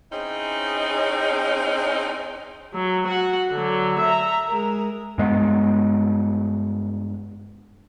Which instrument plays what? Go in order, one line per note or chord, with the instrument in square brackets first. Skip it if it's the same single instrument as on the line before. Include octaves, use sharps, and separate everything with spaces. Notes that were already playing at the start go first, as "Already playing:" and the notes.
[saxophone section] C4 C#4 D#4 E4 G#4
[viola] F#3
F#4 F#5
D3 F#3
E5 A#5
G#3 A#4
[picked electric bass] G2 G#3 A#3 B3